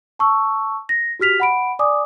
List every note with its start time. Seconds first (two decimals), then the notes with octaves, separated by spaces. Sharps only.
0.19 A5 C#6 E6
0.89 A#6
1.20 F#4 G4 F6 B6 F7
1.40 F#5 B5 D7
1.79 D5 G#5 D6 D#6